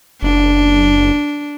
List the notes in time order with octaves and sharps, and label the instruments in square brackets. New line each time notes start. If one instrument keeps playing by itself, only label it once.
[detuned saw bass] F#1 [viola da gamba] D4